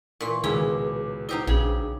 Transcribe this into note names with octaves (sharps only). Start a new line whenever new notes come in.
A#2 E3 C6 C#6
C#2 B2 D#3 C#4 E4 G#4 D6
D#4 E4 G4 C5 D#5 F#5
A#1 C#3 D4 G#4